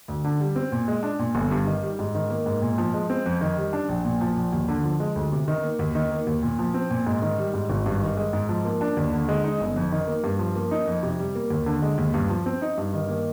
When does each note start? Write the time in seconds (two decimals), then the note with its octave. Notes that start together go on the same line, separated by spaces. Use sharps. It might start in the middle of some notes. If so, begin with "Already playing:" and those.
0.08 D2
0.24 D3
0.40 G3
0.56 C4
0.72 A#2
0.88 G#3
1.03 D4
1.19 A#2
1.35 G1
1.51 G2
1.67 D#3
1.83 G3
1.99 G#2
2.15 D#3
2.30 A#3
2.46 G#2
2.62 A#2
2.78 F3
2.94 G#3
3.10 C4
3.26 F2
3.41 D#3
3.57 G3
3.73 D4
3.89 A#1
4.05 A#2
4.21 F3
4.37 A#1
4.53 D#2
4.68 D3
4.84 F3
5.00 G#3
5.16 D2
5.32 C3
5.48 D#3
5.63 A#3
5.79 D#2
5.95 D#3
6.11 A#3
6.27 D#2
6.43 A#2
6.59 F3
6.74 C4
6.90 A#2
7.07 G#2
7.22 D#3
7.38 G3
7.54 G#2
7.70 G#1
7.86 G2
8.01 D#3
8.17 G#3
8.33 G#2
8.49 F3
8.65 A#3
8.81 D4
8.97 D#2
9.13 D3
9.29 G#3
9.44 D#4
9.60 G1
9.76 F2
9.92 D#3
10.08 A#3
10.24 G2
10.39 F3
10.56 A#3
10.71 D#4
10.87 F2
11.03 C3
11.19 G3
11.35 A#3
11.50 D#2
11.66 D3
11.82 G#3
11.98 D#2
12.14 G2
12.30 F3
12.46 C4
12.62 D#4
12.78 G2
12.94 D#3
13.09 A#3